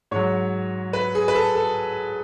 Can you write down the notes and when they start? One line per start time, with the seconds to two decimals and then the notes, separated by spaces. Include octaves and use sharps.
0.11 G#2 F#3 C#5
0.93 B4
1.15 G#4
1.28 B4
1.35 A4
1.55 A4